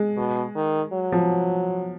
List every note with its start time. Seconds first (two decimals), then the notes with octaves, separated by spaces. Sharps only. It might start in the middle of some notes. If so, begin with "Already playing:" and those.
Already playing: G#3
0.17 B2
0.55 D#3
0.93 F#3
1.12 F3